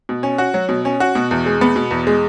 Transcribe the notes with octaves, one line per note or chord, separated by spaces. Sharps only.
B2
C#4
F#4
F#3
B2
C#4
F#4
B2
E2
G#3
B3
B2
E2
G#3